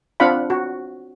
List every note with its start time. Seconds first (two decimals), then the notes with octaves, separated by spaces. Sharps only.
0.20 C4 D4 F4 F5 F#5 B5
0.50 F#4